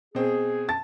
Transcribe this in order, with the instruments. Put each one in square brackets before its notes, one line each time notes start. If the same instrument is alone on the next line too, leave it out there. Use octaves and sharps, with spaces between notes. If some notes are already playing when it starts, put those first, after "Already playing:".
[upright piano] B2 C4 [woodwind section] G#4
[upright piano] A5 A6